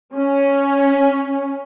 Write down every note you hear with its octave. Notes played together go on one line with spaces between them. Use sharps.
C#4